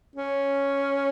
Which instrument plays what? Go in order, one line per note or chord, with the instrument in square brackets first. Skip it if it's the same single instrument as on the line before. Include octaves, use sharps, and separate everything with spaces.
[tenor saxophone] C#4